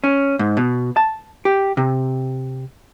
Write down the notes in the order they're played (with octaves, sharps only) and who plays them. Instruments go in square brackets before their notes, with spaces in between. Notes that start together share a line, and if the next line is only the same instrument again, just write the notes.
[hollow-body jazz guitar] C#4
G#2
B2
A5
G4
C3